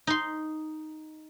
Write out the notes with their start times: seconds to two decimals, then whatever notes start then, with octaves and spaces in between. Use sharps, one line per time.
0.07 D#4 C6